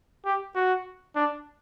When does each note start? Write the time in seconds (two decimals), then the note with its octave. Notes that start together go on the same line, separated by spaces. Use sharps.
0.25 G4
0.55 F#4
1.16 D4